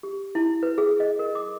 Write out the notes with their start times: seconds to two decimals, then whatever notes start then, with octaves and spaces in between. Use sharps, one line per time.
0.03 G4
0.35 E4
0.63 B4
0.78 G#4
1.00 D#5
1.19 A#4
1.35 D6